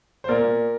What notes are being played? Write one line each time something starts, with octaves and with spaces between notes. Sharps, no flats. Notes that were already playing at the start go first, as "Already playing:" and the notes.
C5
A#2 A#4 D5
A#2